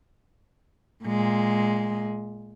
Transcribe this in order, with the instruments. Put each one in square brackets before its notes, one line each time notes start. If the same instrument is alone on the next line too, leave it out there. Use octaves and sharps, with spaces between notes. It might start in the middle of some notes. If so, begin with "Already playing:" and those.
[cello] A#2 G#3